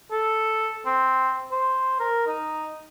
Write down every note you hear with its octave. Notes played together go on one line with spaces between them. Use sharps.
A4
C4
C5
A#4
D#4